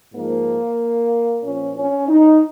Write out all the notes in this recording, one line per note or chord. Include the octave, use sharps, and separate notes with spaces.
G#2 F3 A#3
A#2 F3 C#4
C#4
D#4